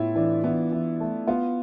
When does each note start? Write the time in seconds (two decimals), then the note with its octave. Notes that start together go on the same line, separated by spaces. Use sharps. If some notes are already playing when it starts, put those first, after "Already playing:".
Already playing: A2 B3 E4 F4
0.15 E3 D4
0.44 E3 B3
0.72 E3
1.00 A3
1.27 B3 F4